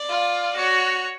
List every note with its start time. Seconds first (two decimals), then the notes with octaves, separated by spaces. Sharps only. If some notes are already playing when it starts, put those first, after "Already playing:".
Already playing: D5
0.10 F4
0.57 F#4 C#5